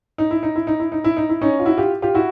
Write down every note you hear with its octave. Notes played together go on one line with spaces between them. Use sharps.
D#4
E4
D#4
E4
D#4
E4
D#4
E4
D#4
E4
C#4 D#4
F4
E4 F#4
F4 G4
F4 G4
E4 F#4